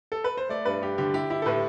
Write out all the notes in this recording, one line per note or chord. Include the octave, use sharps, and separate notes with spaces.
A4
B4
C5
A3 D5
G2 B4
G2 G4
D3 G4
E4 G4
E4 G4
A4
A2 B4